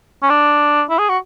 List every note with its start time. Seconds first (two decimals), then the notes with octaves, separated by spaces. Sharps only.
0.22 C#4
0.30 D4
0.90 E4
0.99 G#4
1.09 F#4